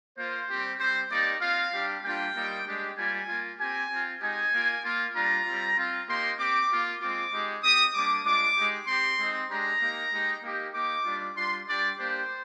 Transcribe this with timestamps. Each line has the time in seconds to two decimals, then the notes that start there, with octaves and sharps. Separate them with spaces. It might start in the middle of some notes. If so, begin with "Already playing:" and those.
0.18 A#3 F4 C5
0.49 G3 C4 G4
0.80 G3 C4 G4 C5
1.10 A#3 D#4 G4 D5
1.41 C4 F4 F5
1.73 G3 D4 G4
2.03 G3 A#3 D4 F4 G5
2.35 G3 A#3 D#4 G4
2.67 G#3 D4 G4
2.97 G3 A#3 F4 G#5
3.28 A#3 F4
3.60 C4 G4 G#5
3.90 C4 F4
4.21 G#3 D#4 G4 G#5
4.52 A#3 F4
4.83 A#3 F4
5.15 G3 D4 F4 A#5
5.45 G3 C4 F4
5.77 C4 F4
6.08 A#3 D#4 G4 C6
6.39 C4 G4 D6
6.71 A#3 F4
7.01 G#3 C4 F4 D6
7.32 G#3 D#4 G4
7.63 C4 G4 D#6
7.94 G3 A#3 D4 D6
8.25 G#3 D4 F4 D6
8.57 G#3 D#4 G4
8.87 C4 G4 C6
9.19 G#3 C4 D#4
9.49 G#3 D4 G4 A#5
9.80 A#3 D#4 G4
10.12 G#3 D#4 G4
10.43 A#3 D#4 G4
10.73 A#3 D#4 G4 D6
11.05 G3 D4 F4
11.36 G3 D4 F4 C6
11.68 G3 D4 G4 D5
11.98 A#3 D4 G4 C5